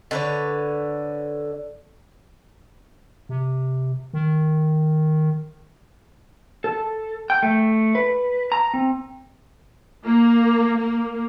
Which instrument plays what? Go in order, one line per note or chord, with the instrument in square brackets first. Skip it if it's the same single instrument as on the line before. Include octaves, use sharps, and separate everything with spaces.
[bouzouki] D3 B4 C#5
[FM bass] C3
D#3
[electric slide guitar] A4
G5
A3
B4
A#5
C4
[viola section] A#3
A#3